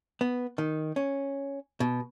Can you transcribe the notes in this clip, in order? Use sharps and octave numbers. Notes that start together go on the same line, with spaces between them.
B3
D#3
C#4
B2